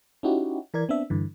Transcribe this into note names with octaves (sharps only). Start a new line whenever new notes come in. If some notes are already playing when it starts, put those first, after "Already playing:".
C#4 D#4 E4 F#4 G4
E3 A#4 D5 G#6
B3 C4 D4 E5
G2 D3 E3